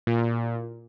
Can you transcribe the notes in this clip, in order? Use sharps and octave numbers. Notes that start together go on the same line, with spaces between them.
A#2